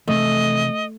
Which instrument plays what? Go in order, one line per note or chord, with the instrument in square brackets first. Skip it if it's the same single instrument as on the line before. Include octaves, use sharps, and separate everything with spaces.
[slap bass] C3 E3 F3 [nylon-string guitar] A3 [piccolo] D#5